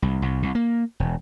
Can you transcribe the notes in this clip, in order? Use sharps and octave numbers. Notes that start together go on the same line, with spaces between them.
C2
C2
C2
A#3
E1